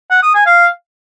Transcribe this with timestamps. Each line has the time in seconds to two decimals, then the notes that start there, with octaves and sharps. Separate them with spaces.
0.10 F#5
0.22 D#6
0.34 G#5
0.46 F5